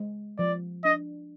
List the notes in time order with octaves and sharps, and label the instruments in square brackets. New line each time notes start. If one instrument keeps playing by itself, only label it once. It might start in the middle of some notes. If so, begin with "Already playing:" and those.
Already playing: [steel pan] G#3
[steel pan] F3 [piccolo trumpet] D5
[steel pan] D4 [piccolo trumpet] D#5